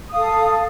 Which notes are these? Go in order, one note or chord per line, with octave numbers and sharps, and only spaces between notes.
A4 F5 D#6